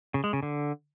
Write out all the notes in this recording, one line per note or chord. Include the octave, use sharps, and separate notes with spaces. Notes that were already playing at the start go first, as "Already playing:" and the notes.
C#3
G#3
C#3
D3